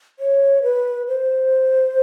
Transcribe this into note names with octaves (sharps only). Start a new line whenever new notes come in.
C#5
B4
C5